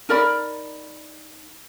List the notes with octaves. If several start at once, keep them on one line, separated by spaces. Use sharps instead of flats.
D#4 A#4 D5 B5